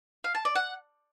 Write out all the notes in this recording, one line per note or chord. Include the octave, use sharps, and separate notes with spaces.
F5
A5
D5
F#5